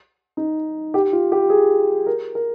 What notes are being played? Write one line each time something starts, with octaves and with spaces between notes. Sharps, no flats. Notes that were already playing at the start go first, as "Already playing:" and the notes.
D#4
G4
F4
G4
G#4
A#4
A#4